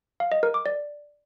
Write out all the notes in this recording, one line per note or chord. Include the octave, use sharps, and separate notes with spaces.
F5
D#5
A#4
D6
D5